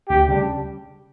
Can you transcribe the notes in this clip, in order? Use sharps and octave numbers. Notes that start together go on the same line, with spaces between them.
D2 G4
C#3 G3 D4